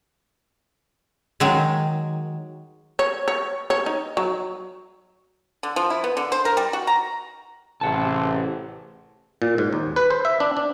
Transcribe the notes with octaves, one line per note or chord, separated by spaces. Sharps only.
D#3 F#3 G#3
C#5
C#5
C#5
D#4
F#3
D3
F3
E4
B3
D3
C5
A#4
G3
F#4
A#5
A1 C3 G#4 F#5 A5
A#2
G#2
D#2
B4
C5
E5
D4
D4